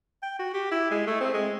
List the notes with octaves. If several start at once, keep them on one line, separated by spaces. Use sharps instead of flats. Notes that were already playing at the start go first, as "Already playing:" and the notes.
G5
F#4
G4
E4
G#3
A3
C4
G#3